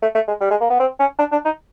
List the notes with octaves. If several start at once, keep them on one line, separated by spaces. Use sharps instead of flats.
A3
A3
G#3
G3
G#3
A#3
B3
C4
C#4
D4
D4
D#4